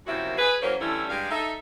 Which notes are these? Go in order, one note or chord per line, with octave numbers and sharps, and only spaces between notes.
F#2 C3 F3 A#3 E4 F#4
G#4 B4
E3 F#3 A#3 C#4 A#4 C5
D3 E3 G3 A3 C#4 E4
G2 G#3 G4 F5
D#4 A4 E5